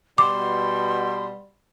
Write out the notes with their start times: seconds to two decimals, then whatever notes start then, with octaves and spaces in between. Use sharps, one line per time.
0.18 B2 G3 C6 D6